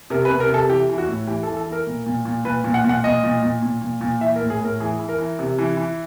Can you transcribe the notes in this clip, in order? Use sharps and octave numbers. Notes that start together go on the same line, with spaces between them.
C3 A#4
B4
C3
A#4
C3 A4
E3 G4
E3
F#4
A2
E3 G4
A4
E3
A4
E3
A#4
A#2
A#2
A#2
A#2 B4
A#2
F#5
A#2 F#5
A#2 D#5
A#2
A#2
A#2
A#2
A#2
E3 E5
A#4
A2
G#4
A2 A#4
E3 G#4
E3
A#4
E3
C3
E3
E3